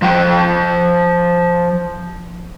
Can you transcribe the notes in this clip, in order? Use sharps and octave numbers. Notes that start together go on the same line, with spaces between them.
F3 C5 G5